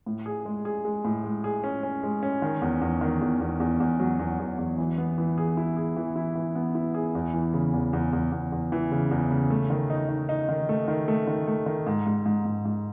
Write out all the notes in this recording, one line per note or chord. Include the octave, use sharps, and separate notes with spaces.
A2
G#4
G#3
G#4
G#3
A2
G#3
G#4
C#4
C#4
G#3
C#4
D#3
E2
E2
D#3
E2
E2
E2
E2
F#3
E2
E2
E2
E3
B3
E3
G#4
E4
G#4
E3
E4
E3
B3
E4
G#4
E2
E3
C#3
E2
E2
E2
E2
E2
E3
C#3
E2
C#3
A3
D#3
D#4
D#4
D#4
D#3
A3
D#3
A3
D#3
A3
D#3
G#2
G#2
G#2
G#2
G#2